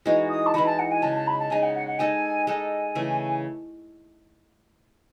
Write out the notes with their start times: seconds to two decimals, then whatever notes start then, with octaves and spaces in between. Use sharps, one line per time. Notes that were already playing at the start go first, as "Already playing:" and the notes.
0.06 E3 G#3 D#4 F#4
0.30 D#6
0.46 A5
0.54 E3 G#3 D#4 F#4 B5
0.65 A5
0.78 F#5
0.91 G#5
1.02 C#3 G#3 D#4 A5
1.15 A5
1.27 B5
1.38 A5
1.50 C#3 G#3 D#4 G#5
1.62 F#5
1.75 F#5
1.87 F#5
1.99 G#3 D#4 A4 G#5
2.47 G#3 D#4 A4 G#5
2.95 C#3 E3 A3